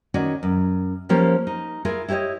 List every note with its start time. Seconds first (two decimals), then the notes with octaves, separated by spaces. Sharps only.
0.14 D#3 C#4 D#4 F#4 D5
0.43 F#2
1.09 F3 A#3 C#4 F4 G4
1.47 D#4
1.85 E4 F4 G#4 A#4
2.08 E4 G4 A4 C#5 D#5